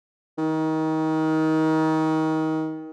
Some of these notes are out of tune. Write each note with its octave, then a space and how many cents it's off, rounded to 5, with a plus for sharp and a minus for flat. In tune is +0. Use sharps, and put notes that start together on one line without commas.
D#3 +25